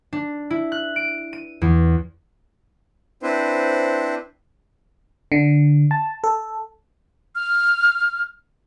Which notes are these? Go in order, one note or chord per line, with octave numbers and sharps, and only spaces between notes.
D4
E4
F#6
D7
D#7
E2
C4 D4 E4 B4 C5
D3
A5
A4
F6